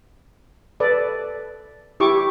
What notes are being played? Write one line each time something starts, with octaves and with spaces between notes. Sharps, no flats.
A4 B4 D5
E4 G4 C#6 D6